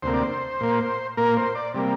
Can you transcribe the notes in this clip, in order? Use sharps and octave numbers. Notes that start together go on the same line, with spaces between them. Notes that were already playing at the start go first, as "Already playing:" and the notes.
D2 C3 A#3 C5
D5
C5
A#2 A#3
A#2 A#3 A#4
C5
D5
C3 G3 A#3